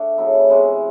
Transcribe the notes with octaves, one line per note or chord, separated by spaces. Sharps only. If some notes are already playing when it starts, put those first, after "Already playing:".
Already playing: A3 D4
C#3 F#3 B3 E4
C3 E3 G#3 C#4